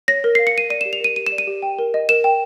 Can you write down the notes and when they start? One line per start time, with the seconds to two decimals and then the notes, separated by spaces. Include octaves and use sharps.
0.08 C#5 A#6
0.24 A#4
0.35 C7
0.39 F5
0.47 C#7
0.55 A#4 D#7
0.70 D5 D#7
0.81 E7
0.85 G4
0.93 F7
1.01 A#4 D#7
1.16 G4 D#7
1.26 E7
1.32 D5
1.38 D#7
1.47 G4
1.62 G5
1.79 A#4
1.94 D#5
2.09 A#4 E7
2.24 G5